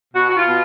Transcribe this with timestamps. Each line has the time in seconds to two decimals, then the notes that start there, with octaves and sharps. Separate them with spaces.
0.14 B2 F#4
0.29 F#4
0.36 F4
0.47 B2